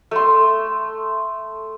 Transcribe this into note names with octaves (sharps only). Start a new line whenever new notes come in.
A3 C6